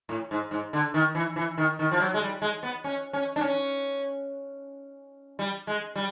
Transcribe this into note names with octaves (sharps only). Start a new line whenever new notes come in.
A2
G#2
G#2
D3
D#3
E3
E3
D#3
D#3
F3
F#3
G#3
G3
G#3
B3
C#4
C#4
D4
C#4
G3
G#3
G3